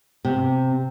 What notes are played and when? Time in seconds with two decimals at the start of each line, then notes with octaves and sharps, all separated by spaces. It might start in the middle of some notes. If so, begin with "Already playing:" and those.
0.25 C3